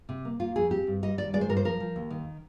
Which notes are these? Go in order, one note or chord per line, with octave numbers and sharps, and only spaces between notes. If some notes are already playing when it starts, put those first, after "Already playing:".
C3
A#3
A#3 F4
F2 G#4
C4 G4
G2
G3 D#5
D#3 D5
G#3 D5
C5
G2 A#4
C5
F3 A#4
F3
D#2
D#3